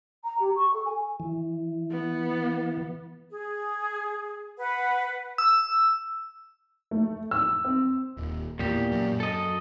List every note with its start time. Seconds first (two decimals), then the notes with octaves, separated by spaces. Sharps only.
0.24 A#5
0.40 G4
0.56 C#6
0.74 A4
0.85 G#5
1.20 E3
1.91 B3
3.30 G#4
4.58 B4 F#5
5.38 E6
6.91 A3
7.31 E6
7.65 C4
8.17 D#1
8.59 E2 A#2 G4
8.92 F#2
9.20 A4 D#5